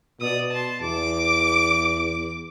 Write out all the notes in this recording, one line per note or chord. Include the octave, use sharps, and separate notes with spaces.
B2 D5 D#6
A5 C6
E2 D6